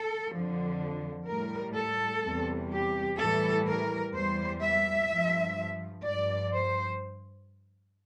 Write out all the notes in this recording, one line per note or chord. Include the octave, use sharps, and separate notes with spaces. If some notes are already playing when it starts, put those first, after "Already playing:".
Already playing: A4
F2 D3 F3
A2 G3 A#4
A4
E2 C3 G3
G4
A2 E3 G3 A4
A#4
E2 E3 G3 C5
E5
G2 F3
G2 F3 D5
C5